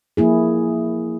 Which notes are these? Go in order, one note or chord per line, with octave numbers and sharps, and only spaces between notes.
F3 A#3 E4 G#4